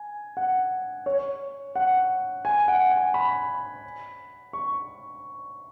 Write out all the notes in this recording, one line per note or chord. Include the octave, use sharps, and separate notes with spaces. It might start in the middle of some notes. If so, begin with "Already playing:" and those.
Already playing: G#5
F#5
C#5
F#5
G#5
F#5
G#5
B5
C#6